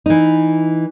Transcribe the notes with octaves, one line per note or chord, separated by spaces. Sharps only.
E3 D#4